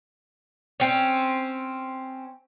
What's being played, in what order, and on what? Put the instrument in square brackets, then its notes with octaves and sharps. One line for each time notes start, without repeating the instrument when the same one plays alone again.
[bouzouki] C4 C#4